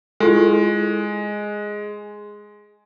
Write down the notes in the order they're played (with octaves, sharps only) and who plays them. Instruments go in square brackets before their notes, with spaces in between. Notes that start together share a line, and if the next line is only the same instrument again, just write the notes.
[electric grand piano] G#3 [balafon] E4 F4 A4